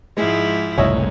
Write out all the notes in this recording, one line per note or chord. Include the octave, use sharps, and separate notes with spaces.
G#2 F3 G#3 E4
F#1 C2 A2 C#5 D#5 E5